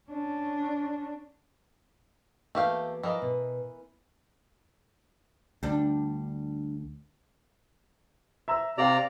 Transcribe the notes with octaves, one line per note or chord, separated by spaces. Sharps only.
C#4 D4
E2 A3 A#3 F#4 G4 F5
E3 F3 A#4 D5 D#5
B2
D2 G3 D4
E5 A#5 E6
C3 G4 D5 F5 A#5